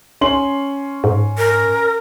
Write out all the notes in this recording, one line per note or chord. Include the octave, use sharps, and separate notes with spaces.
C#4 C6 F#7
G#2
A#4